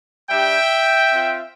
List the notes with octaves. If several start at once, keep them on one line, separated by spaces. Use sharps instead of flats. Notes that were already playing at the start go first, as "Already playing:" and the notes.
G3 D4 G4 E5 G5
C4 F4